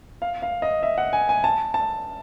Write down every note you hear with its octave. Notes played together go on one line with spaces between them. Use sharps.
F5
F5
D#5
E5
F#5
G#5
G#5
A5
A5